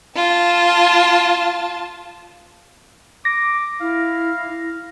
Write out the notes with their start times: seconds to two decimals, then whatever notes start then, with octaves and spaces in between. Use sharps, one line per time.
0.16 F4 A5
3.25 D6 A#6
3.81 E4 F5